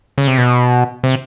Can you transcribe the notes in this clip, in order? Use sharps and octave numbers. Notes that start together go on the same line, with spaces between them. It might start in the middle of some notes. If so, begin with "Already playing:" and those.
C#3
C3
B2
C3